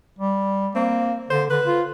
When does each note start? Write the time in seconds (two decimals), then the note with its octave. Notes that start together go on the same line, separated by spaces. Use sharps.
0.19 G3
0.75 A#3 C4
1.30 D3 C5
1.50 D3 B4
1.66 F4